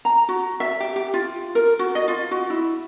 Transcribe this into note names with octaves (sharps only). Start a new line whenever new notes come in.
A#5
F#4
E5
G4
G4
F4
A#4
F#4
D#5
F4
F#4
E4